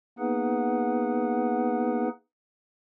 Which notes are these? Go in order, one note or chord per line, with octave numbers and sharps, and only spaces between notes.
A#3 B3 D#4 G#4 B4 F#5